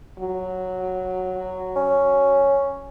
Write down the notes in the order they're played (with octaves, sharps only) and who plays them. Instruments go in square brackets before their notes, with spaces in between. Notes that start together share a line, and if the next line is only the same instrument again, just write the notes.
[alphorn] F#3
[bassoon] C#4